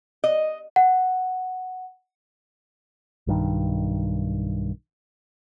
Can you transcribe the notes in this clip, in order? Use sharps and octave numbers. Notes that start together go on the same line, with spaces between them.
D#5
F#5
B1 G2 D#3